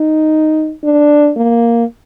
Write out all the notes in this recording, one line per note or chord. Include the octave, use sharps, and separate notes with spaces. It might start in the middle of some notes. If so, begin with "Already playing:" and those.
Already playing: D#4
D4
A#3